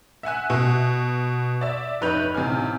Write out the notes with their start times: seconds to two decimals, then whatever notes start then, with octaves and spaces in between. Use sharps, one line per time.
0.23 E5 F#5 G#5 F#6
0.50 B2
1.61 D5 E5
2.01 F1 D#4 B4 C#5 G6 F7
2.34 A1 C3 D#4 G#5 F6